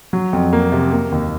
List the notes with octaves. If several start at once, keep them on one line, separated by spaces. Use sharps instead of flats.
F#3
F2
A#3
C3
A#3
D#2